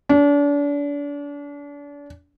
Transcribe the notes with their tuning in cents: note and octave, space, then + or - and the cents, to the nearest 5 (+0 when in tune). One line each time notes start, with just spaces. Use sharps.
D4 -35